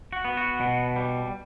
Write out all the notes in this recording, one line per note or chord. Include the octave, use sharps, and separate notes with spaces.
F#4
B3
F#4
B2
G3